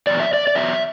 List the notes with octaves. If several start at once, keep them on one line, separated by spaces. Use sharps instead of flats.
E2 B2 F#3 D5
E5
D5
D5
E2 B2 F#3 E5